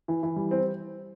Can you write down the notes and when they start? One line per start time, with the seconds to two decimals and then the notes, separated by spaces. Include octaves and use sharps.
0.08 E3
0.23 E3
0.36 G3
0.51 C4